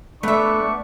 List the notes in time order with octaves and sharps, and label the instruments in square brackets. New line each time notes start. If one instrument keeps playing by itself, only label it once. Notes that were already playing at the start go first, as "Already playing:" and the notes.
[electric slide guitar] A3 [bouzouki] B3 E5 [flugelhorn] D4 [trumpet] C#6